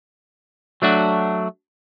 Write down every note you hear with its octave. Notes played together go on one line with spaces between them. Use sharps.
F#3 A3 D4 F#4